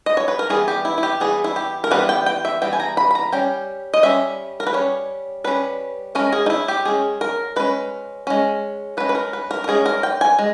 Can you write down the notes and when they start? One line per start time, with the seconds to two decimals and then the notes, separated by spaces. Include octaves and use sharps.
0.06 D#5
0.17 C#5
0.28 B4
0.39 A#4
0.50 E3 G3 B3 G#4
0.68 G4
0.85 E4
0.98 E4
1.03 G4
1.20 E3 G3 B3 G#4
1.44 E4
1.56 G4
1.84 A#4
1.91 E3 G3 B3 B4
2.09 G5
2.26 G5
2.45 E5
2.62 E3 G3 B3 G5
2.73 G#5
2.80 A#5
2.97 B5
3.11 B5
3.15 A#5
3.32 G3 C#4 G5
3.94 D#5
4.03 G3 C#4 E5
4.60 A#4
4.67 B4
4.73 G3 C#4 C#5
5.44 G3 C#4 B4
6.15 G#3 C#4 A#4
6.33 G#4
6.46 D#4
6.50 E4
6.68 G4
6.85 G#3 C#4 G#4
7.21 A#4
7.56 G#3 C#4 B4
8.27 G#3 C#4
8.97 G#3 B4
9.00 C#4
9.09 B4
9.15 A#4
9.33 B4
9.51 A#4
9.64 A#4
9.68 G#3 C#4 G#4
9.86 A#4
10.03 G5
10.21 G#5
10.39 G#3